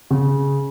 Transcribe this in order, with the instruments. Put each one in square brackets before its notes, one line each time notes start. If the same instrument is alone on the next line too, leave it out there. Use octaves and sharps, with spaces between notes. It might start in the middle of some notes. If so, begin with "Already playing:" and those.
[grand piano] C#3